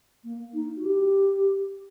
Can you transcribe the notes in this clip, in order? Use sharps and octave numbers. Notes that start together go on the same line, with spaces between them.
A#3
D#4
F#4
G4